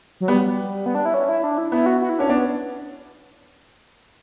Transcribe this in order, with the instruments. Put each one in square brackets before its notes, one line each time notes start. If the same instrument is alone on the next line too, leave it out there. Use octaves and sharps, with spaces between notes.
[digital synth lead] F#3
[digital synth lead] G3 [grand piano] B3
[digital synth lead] B3
D4
E4
C#4
E4
D4
E4
[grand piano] B3 [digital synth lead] E4
[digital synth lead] F#4
F#4
E4
[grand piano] C#4 [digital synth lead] D4
[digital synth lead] B3 [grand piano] D4